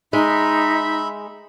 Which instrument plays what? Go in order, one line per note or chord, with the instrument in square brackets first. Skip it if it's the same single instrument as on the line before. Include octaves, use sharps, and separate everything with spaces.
[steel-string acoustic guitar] G#3 [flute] D#4 [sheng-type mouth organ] E5 B5